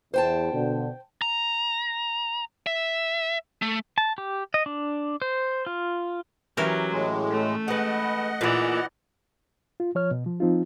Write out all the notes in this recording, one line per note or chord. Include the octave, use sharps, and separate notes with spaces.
E2 C5 G5 A5
B2 D3
A#5
E5
A3
A5
G4
D#5
D4
C5
F4
E3 F#3 C#4 G4 A#4
A2 G#3
A3
G#3 B4 D#5 F#5
A#2 E3 G#4 D5
F4
F3 C#5 F6
B2
F3
F3 C4 D#4 F4